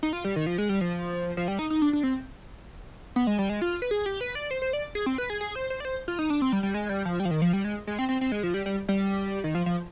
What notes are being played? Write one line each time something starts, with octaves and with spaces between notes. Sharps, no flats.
D#4
F4
G3
D#3
F3
G#3
G3
F3
F3
G3
D#4
D#4
D4
D4
C4
B3
G#3
G3
G#3
F4
B4
G#4
G4
B4
D5
C5
C5
D5
G#4
C4
B4
G#4
G#4
C5
C5
D5
C5
F4
D#4
D4
C4
G3
G3
G#3
G3
F3
G3
F3
D#3
F3
G3
G#3
G#3
C4
C4
C4
G#3
F3
G3
G3
G3
D#3
F3
F3